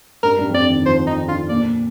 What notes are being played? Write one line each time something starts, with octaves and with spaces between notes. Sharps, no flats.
G2 A#4
G2
F2
G2 D5
D#3
F3 C5
D#3 D#4
D3 F4
A#2 D5